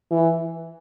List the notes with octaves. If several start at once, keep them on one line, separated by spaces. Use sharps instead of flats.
E3